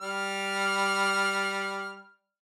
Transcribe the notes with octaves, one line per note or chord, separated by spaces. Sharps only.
G3 F6